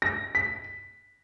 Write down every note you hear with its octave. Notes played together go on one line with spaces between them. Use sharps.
A#6
B6